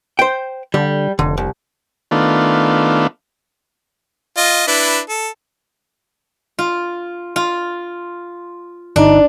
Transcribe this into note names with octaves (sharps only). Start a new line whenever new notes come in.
C5 G5
D3 G3
F1 D3
C2
D#3 A3 B3 D4 F4
F4 D#5
D4 E4 B4
A4
F4
F4
G1 D4 D#4